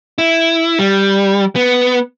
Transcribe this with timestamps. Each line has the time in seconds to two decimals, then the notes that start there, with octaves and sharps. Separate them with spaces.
0.18 E4
0.79 G3
1.56 B3